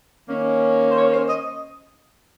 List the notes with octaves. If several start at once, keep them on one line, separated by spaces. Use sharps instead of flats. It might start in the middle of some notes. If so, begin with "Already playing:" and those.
D#3 A#3 C#4
C5
C#5
C5
D#5